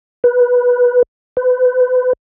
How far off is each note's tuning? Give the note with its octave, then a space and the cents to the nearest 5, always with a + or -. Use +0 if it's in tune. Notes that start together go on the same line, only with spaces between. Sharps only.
B4 -10
B4 +35